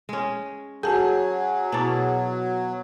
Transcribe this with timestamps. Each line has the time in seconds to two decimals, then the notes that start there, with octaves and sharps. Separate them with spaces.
0.09 G#3 C#4
0.83 F#3 F#4 G#4 A5 G6
1.72 B2 E4 D5 A5 A#5